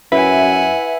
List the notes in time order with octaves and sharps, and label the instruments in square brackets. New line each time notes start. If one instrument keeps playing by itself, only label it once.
[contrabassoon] F#2 [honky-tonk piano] E4 [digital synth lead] B4 [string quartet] F#5 G#5